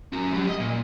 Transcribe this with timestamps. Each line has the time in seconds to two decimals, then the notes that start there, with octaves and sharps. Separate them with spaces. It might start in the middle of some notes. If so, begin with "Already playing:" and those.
0.13 C#4 F#4
0.33 F#3 G3
0.48 D#5
0.59 A#2